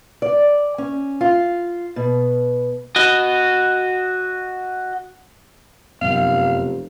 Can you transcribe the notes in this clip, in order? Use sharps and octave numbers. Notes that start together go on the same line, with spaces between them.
D5
C#4
F4
B2
F#4 D#5
F1 F#2 C3 F#3 B3 F5